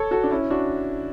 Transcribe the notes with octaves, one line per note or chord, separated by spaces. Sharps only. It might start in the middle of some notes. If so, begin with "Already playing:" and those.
Already playing: A4 C#5
F#4 A4
D4
C#4 E4
D4 F#4